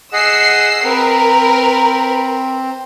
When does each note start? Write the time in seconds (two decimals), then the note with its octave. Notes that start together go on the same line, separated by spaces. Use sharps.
0.13 G#4 D#5 F#5 E6 C7
0.84 C4 A#4 B4